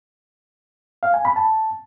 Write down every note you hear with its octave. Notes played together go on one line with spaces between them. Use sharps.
F5
G#5
B5
A5